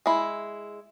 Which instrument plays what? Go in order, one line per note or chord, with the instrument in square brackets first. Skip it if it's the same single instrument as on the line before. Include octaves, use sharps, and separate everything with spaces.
[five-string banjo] G#3 E4